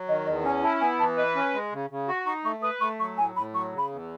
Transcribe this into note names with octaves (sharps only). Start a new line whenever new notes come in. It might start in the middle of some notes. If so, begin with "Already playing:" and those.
Already playing: F#3
D#3 D#5
E2 D#5
C#4 G#5
E4 A5
B3 G#5
E3 A5
B4 D#5
C#4
G#3
C#3
C#3
F#4 C#6
D#4 C#6
A3 C#6
B4 D#6
A3 C#6
F#3 C#6
A2 G#5
A2 B5
F#3 C#6
C#3
B5
E2